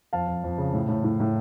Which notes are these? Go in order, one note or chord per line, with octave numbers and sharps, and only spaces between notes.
F2 F5 A5
F2
F2
C#3
A2
A2
A2
A2